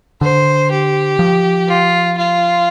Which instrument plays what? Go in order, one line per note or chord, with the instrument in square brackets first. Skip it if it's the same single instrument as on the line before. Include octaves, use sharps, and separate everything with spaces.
[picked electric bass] D3 [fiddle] C5
[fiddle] G4
[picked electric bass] F3
[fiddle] F4
F4